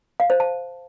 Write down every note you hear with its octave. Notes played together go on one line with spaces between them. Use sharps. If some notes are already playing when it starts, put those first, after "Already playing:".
F5
C5
A5